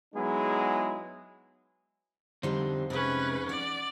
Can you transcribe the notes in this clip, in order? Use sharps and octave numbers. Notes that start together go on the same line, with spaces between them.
F#3 G#3 B3 D#4 E4 G#4
F2 D3 G3 C4 D#4 C5
C3 G#3 C#4 B4
D5 F#5